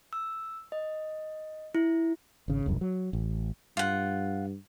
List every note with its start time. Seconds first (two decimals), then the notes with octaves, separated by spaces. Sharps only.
0.13 E6
0.72 D#5
1.75 E4
2.48 G#1 C#3
2.66 E1 C2 F#2
2.81 F#3
3.13 A1
3.77 G2 F4 F#5